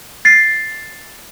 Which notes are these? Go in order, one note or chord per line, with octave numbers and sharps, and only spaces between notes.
A6 C7